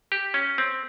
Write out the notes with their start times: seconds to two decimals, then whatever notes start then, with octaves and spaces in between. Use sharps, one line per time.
0.12 G4
0.34 C#4
0.58 C4